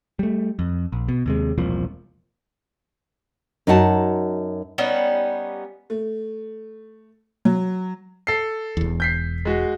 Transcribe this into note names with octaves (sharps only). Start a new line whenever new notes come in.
G3 A3
F2
A#1
B2
D#2 C3 G#3
E1 C2 A#2 F3
F#2 D#4 F#4 F#5 A5
G3 B3 C#4 D#4
A3
F#3
A4 C7
E1 E2
G6 B6 C7
G#3 F#4